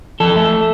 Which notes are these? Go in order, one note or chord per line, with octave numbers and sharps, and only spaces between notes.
F3 A4
A3